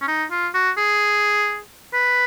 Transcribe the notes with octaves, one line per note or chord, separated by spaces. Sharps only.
C#4
D#4
F4
F#4
G#4
B4